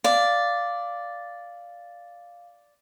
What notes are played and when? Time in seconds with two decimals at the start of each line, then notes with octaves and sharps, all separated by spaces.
0.04 D5 F5